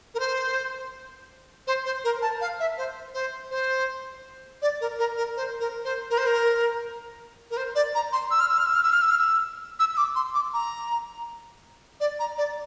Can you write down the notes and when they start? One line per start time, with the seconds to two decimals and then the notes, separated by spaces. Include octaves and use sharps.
0.14 A#4
0.19 C5
1.67 C5
1.85 C5
2.04 A#4
2.22 A5
2.41 F5
2.60 E5
2.78 C5
3.14 C5
3.51 C5
4.62 D5
4.81 A#4
4.99 A#4
5.17 A#4
5.37 C5
5.60 A#4
5.85 C5
6.10 A#4
6.18 C5
6.26 A#4
7.51 A#4
7.57 C5
7.75 D5
7.95 A#5
8.13 C6
8.31 E6
8.40 F6
8.49 E6
8.58 F6
8.66 E6
8.74 F6
8.83 E6
8.93 F6
9.02 E6
9.11 F6
9.18 E6
9.79 E6
9.93 E6
9.97 D6
10.15 C6
10.34 D6
10.53 A#5
12.00 D5
12.19 A#5
12.38 D5